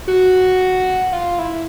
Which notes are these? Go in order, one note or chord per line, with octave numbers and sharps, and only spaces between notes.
F#4
F4
E4